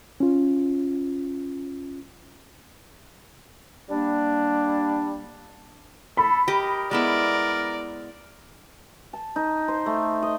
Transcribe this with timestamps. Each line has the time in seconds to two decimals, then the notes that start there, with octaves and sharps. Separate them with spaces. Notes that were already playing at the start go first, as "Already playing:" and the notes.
0.20 C#4 F4
3.90 G3 A#3 D4
6.17 A4 B5
6.48 G4 A#4 D#5
6.91 G#3 B3 E4 A#4 D5
9.13 A5
9.36 D#4
9.68 C5
9.86 A3
10.23 D#5